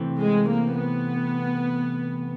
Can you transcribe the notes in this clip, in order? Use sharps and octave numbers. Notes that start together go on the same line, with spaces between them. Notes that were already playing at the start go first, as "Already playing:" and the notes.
Already playing: C3 E3 A3 C4
G#3
A#3
B3